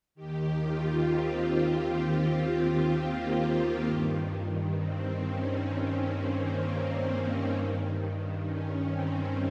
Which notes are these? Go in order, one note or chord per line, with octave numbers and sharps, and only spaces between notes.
D#2 D#3 G4
F4
C4
C4
C4
A#3
G2 D#3
C4
C#4
C4
A#3
C4
G2 D#3
C#4
C4